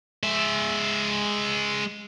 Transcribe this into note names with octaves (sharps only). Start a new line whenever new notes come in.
G#3 E5